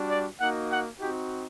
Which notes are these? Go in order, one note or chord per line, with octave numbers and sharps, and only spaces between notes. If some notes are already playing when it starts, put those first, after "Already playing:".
Already playing: G3 D4 F#4
D5
A#3 D#4 F#4 F#5
F#5
C4 D#4 F#4 G4